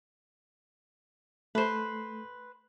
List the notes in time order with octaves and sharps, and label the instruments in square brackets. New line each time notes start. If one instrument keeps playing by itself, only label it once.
[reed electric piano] A3 [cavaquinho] B4 C5